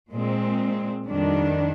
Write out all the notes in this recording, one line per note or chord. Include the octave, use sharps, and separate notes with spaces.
A#2 G#3 C4
F2 D#3 G3 D4